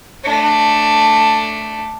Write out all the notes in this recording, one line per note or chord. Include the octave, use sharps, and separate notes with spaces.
A3 D4